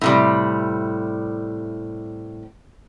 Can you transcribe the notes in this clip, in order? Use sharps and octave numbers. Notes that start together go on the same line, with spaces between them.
A2 C3 G3